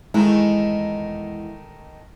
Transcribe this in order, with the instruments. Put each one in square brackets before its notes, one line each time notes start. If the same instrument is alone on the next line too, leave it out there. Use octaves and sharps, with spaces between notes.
[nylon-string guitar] E2 E4 [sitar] D#3 A3 D#4 [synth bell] G#3